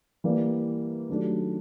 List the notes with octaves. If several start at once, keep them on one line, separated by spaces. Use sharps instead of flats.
E3 G3 A#3
D#3 F#3 A3 D4 G4